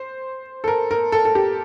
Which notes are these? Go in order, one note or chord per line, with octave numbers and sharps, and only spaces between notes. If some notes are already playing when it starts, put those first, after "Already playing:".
Already playing: C5
A4
A#4
A#4
A4
A4
G4